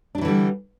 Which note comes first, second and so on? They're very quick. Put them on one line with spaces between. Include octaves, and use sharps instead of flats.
D4 F#3 E3 D3 G3